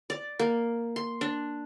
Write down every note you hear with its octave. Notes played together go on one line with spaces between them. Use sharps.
D5
A#3
C6
D4